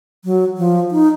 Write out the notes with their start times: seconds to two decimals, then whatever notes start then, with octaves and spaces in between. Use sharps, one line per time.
0.25 F#3
0.58 F3
0.91 D#4